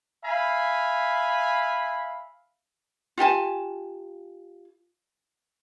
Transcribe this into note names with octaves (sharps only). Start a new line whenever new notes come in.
E5 F5 G#5 B5
F4 G4 G#5 A5